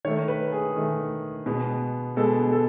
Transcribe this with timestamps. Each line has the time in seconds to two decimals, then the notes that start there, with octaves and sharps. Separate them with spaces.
0.05 D#3 A3 C#5
0.28 B4
0.52 G#4
0.76 D#3 A3
1.46 B2 G#3 B3
2.17 B2 G#3 B3 A4
2.52 A4